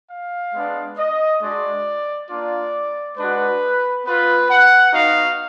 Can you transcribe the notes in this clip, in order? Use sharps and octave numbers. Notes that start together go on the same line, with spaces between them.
F5
G#3 B3 D4
D#5
G#3 D4 F#4 D5
A#3 D4 F4 D5
G#3 D4 F#4 B4
B3 F4 B4
F#5
B3 D#4 F#4 F5